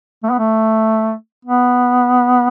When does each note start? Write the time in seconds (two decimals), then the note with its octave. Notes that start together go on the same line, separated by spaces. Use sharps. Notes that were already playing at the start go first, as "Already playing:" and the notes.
0.23 A3
0.31 B3
0.38 A3
1.45 B3